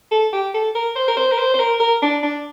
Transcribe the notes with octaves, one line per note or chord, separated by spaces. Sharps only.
A4
G4
A4
A#4
C5
A#4
C5
A#4
C5
C5
A#4
A#4
D4
D4